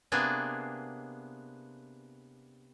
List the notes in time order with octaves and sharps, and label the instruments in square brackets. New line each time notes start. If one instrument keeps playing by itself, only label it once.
[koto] C3 A#3 B3 D4 G#4